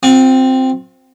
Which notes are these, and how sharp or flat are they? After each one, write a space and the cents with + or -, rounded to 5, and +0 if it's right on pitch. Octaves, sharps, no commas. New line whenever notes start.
C4 +0 F4 +45